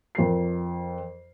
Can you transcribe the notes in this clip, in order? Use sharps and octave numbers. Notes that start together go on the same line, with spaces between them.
F2 A#4 C7